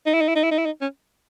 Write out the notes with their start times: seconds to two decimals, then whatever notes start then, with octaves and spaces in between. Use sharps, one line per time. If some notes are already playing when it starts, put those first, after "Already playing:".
0.06 D#4
0.14 E4
0.21 D#4
0.28 E4
0.35 D#4
0.43 E4
0.51 D#4
0.58 E4
0.65 D#4
0.81 C#4